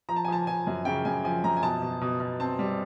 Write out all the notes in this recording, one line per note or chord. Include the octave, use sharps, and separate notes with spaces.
F3 A#5
A5
G#5
F3 A5
F3 G#5
F#2
C#3 G5
F#2 G#5
F3 G#5
F#2 A#5
G#5
B2 A5
B2
B2
B2
C4 A5
G3